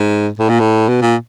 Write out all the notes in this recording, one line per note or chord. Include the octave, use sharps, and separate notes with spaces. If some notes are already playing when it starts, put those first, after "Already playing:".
Already playing: G#2
A2
A#2
A2
B2
A#2